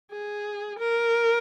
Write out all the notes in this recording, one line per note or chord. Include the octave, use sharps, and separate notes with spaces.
G#4
A#4